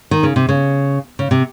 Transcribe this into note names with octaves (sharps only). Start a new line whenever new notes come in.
D#3
C#3
C3
C#3
C#3
C3